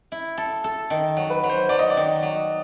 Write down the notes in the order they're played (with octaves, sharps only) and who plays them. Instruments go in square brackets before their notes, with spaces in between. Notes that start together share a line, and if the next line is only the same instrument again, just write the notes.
[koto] E4
A4
A4
D#3
F#3
[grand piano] B4
[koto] F#3
[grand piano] C5
[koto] F#3 [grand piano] D5
[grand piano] D#5
D5
[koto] D#3
F#3